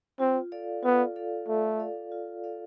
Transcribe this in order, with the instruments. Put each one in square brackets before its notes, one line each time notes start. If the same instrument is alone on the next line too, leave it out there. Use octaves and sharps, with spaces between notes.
[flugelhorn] C4 [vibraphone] F4
[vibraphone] A4 D5 F5
[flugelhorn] B3 [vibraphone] F4
[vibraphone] A4 D5 F5
[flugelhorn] A3 [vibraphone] F4
[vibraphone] A4 D5 F5
F4
A4 D5 F5